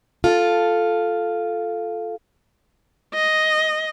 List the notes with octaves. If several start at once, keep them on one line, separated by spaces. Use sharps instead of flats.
F4 A4
D#5